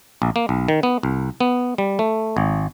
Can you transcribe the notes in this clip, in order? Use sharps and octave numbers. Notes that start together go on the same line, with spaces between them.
A#1
A#3
B1
D#3
B3
C2
B3
G3
A3
G#1